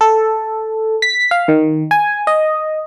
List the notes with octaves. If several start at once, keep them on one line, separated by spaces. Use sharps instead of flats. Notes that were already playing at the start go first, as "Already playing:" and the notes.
A4
B6
F5
D#3
G#5
D#5